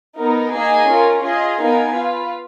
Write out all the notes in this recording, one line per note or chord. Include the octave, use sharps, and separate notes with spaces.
B3 D#4 A#4
A#3 D#4 G#4 D#5 G#5
C#4 F4 A#4
F4 G#4 D#5 G#5
B3 D#4 A#4 F5 G#5
F4 B4 F5